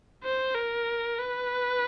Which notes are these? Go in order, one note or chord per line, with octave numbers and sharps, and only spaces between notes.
C5
A#4
B4